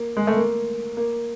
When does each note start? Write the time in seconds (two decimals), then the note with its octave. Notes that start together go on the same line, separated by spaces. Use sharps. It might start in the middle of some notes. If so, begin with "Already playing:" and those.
Already playing: A#3
0.17 G#3
0.27 A3
0.36 A#3
0.97 A#3